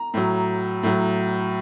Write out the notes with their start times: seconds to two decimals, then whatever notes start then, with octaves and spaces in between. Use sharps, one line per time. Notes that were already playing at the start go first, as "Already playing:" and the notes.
Already playing: A#5
0.14 A2 F#3
0.83 A2 F#3